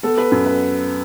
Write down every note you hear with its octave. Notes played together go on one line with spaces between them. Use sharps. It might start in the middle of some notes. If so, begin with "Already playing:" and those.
B3 A4
B4
F#2
B4